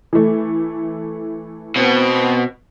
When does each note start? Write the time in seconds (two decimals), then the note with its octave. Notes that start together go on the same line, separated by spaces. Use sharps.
0.13 E3 A3
1.76 B2 B3 C4